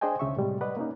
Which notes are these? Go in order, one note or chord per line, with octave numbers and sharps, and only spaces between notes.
D4 G#4 C5 D#5 G5 G#5
C#2 C#3 E5 C#6
A2 C3 G3 G#3
B4 D5 D#5 F#5
A#3 C#4 D#4